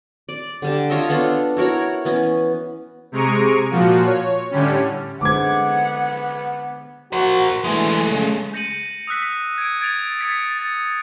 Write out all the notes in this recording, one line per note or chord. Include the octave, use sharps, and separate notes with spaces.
D5
D3 G3 A5
F4 C#5 D#5 E5
B3 D4 F4 A4
E4 F#4 A#4 C#5
E3 B3 C#4
C3 G#3 A#5 C#6 D7 D#7
A#2 F3 F4 F#4
C#5
A2 D3 G3 C#4
D3 G#3 B3 C5 F#5 D6 G#6
F#4 A#4 C5
E3 G#3 A3
C#3
G6 A#6 C#7 D#7 F#7
D#6 E6 F#6 B6
G#6 D7
G#6 A6 D7 F7
D#6 G#6 A6 B6 C#7 D7
A6